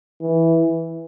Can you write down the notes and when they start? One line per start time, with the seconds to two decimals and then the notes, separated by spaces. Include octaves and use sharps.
0.22 E3